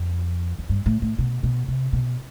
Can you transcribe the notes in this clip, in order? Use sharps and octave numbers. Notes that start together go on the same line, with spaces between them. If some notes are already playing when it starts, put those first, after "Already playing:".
Already playing: F2
F2
G2
A2
A2
B2
B2
C3
B2